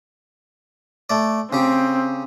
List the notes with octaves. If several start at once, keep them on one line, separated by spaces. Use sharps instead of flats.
A3 D5
C#3 C4 G4